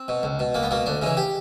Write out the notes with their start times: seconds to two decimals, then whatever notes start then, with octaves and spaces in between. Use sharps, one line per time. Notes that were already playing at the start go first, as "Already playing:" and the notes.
Already playing: C4
0.08 B2
0.23 C#2
0.39 B2
0.54 C#2 A#3
0.63 B3
0.71 B2 A#3
0.86 D2 D4
1.02 C#3 E3 D#4
1.17 G4